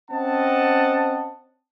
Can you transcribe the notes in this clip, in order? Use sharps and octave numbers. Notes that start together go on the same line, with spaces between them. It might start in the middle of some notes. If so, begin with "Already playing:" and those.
C4 C#4 D#5 F#5 A5